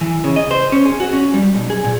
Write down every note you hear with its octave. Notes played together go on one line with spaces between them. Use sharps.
E3
C#3
D#5
C5
C#4
G#4
F#4
C#4
G3
B1
G#4
A#2